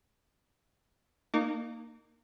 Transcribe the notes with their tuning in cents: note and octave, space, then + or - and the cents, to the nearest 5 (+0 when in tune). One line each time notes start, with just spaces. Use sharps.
A#3 +0 D#4 -30 D6 -30